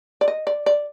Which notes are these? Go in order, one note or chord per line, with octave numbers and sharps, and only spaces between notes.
D5
D#5
D5
D5